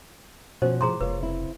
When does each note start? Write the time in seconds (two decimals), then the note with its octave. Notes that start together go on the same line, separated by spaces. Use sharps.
0.62 B2 F3 C#4 F#4 C5
0.81 A2 F3 G#4 A#5 C6
1.01 F1 A#3 F4 B4 C#5
1.20 C#3 C4 E4